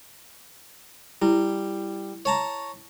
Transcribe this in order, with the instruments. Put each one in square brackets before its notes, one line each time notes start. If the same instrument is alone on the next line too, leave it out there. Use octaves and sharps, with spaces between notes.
[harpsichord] G3 [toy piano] E4
[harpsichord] C#5 A5 A#5